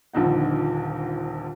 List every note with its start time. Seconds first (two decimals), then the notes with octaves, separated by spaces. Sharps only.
0.13 D#1 A#1 D3 D#4 F#5